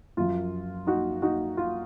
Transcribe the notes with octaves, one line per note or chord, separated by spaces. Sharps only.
F#2 F3 F4
D#4 F#4
D#4 F#4
F4